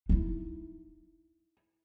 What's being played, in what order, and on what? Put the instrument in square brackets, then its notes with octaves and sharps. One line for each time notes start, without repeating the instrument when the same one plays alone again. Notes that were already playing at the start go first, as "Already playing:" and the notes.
[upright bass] D#4 E4